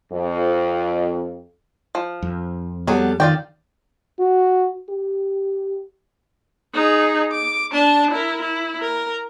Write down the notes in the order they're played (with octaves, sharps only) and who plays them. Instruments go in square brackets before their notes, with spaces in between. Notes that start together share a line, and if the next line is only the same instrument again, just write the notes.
[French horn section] F2
[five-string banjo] F3
[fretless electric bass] F2
[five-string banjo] F#3 G#4 [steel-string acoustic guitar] G3 B3 A4
[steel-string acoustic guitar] D#3 [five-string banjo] F4 D5 G5
[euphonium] F#4
G4
[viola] D#4 G#4
D6
D4 A5
E4 A#4
E4
A#4